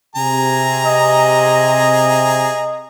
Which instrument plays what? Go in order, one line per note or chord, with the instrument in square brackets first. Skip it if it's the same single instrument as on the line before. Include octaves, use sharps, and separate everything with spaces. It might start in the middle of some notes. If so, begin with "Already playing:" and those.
[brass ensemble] C3 [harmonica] G#4 A#5
[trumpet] D#5